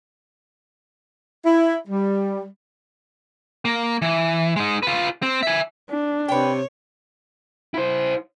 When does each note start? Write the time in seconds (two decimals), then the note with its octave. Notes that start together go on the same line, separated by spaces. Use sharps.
1.45 E4
1.88 G3
3.65 A#3
4.02 E3
4.56 G#3 D#4
4.83 F4 B4
5.23 C4
5.43 E5 G#5
5.89 D4
6.28 C3 B4 C#5 G5
7.74 E4 C5